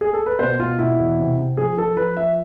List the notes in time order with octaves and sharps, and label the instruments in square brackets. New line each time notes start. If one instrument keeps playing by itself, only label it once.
[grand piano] G#4
A4
B4
B2 C5
B2 F4
B2 E4
E2
C3
C3
F3 G#4
F3 A4
F3 B4
F3 E5